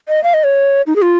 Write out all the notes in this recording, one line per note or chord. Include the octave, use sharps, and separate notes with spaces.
D#5
F5
D#5
C#5
D#4
G#4
F4